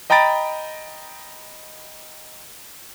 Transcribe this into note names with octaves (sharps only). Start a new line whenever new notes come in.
D#5 G5 A#5 B5 A6 D7